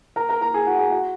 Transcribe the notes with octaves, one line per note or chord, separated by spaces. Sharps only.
A#4 A#5
A#4 A#5
A#4 A#5
G#4 G#5
F#4 F#5
G#4 G#5
F#4 F#5